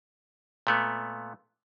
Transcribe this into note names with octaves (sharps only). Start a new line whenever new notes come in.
A#2 A3 B3